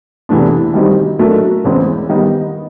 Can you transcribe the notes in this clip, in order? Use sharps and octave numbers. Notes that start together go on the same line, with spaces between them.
E2 C3 E3 A3 D4
D#3 G3 C4 D#4 F#4
F#3 A3 D4 F#4 A#4
E2 C#3 E3 G#3 C4
D#3 G3 B3 D#4